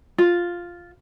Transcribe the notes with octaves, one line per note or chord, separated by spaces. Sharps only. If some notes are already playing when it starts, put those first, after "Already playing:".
F4